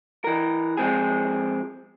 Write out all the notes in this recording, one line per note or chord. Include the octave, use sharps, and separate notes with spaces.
E3 A#4
F3 G#3 C4 G#4